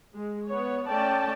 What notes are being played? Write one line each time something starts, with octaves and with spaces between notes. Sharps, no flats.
G#3
B3 C#5
A3 C#4 D5 G5 A5